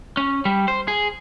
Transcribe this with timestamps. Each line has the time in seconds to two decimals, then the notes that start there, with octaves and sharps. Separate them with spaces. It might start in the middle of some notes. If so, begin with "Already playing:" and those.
0.17 C#4
0.45 G3
0.68 C5
0.88 G#4